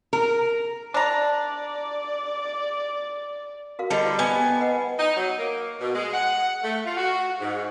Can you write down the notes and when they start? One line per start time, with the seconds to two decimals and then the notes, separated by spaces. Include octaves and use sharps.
0.13 A#4
0.94 D4 D5 A#5
3.79 F#4 A#4 F5
3.90 D3 G3 C#5 D#5 A5
4.04 E4 C5 C6
4.19 B3 G#5
4.44 G5 A5
4.60 B4 D#5 F#5
4.97 D#4
5.16 F#3
5.38 A#3
5.79 B2
5.95 G#3
6.13 F#5
6.63 A3
6.84 F4
6.97 F#4
7.39 G#2